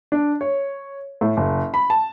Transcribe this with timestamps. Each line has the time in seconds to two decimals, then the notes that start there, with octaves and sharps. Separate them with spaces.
0.12 D4
0.41 C#5
1.21 A2
1.37 F#1
1.74 B5
1.90 A5